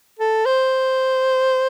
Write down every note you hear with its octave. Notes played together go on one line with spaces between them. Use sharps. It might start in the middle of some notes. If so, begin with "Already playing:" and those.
A4
C5